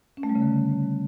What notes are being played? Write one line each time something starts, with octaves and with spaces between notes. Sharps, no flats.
C#4
A3
G3
C#3
D3